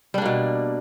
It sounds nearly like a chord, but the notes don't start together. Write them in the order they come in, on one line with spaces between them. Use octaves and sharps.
G3 D4 A#3 B2